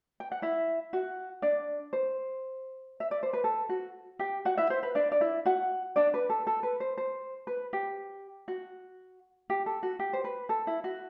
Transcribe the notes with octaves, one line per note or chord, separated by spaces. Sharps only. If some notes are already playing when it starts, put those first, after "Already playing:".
G5
F#5
E4 E5
F#4 F#5
D4 D5
C5
E5
D5
C5
B4
A4
F#4
G4 G5
F#4 F#5
E4 E5
C5
B4
D4 D5
D5
E4 E5
F#4 F#5
D4 D5
B4
A4
A4
B4
C5
C5
B4
G4
F#4
G4
A4
F#4
G4
C5
B4
A4
E4
F#4